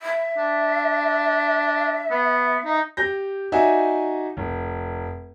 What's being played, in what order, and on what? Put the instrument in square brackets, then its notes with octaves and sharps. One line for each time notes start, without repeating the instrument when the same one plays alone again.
[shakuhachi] E5
[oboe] D4
B3
D#4
[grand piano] G4 G6 A#6
D#4 F#4 D5 E5 G#5
F1